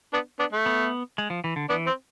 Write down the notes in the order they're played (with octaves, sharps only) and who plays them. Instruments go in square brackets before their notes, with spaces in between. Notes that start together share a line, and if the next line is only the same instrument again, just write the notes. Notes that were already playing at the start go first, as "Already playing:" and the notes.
[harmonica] B3 D4
B3 D4
A3
[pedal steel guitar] B3
G#3
F3
E3
D3
[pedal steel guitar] E3 [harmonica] B3 D4
[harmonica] C4